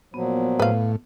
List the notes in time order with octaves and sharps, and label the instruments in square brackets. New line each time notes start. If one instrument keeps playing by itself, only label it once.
[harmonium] A#2 F3 F#3 [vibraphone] B3
[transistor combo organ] A2 [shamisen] B4 F5